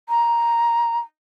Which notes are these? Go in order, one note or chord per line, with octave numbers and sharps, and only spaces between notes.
A#5